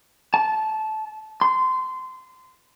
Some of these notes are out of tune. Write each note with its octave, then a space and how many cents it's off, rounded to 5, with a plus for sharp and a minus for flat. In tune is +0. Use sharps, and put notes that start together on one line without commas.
A5 -20
C6 -20